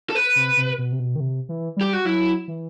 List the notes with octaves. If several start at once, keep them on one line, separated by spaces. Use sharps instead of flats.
A4
B4
C3
C3
B2
C3
B2
D#3
C3
E3
G3 G4
F#4
F#3 E4
E3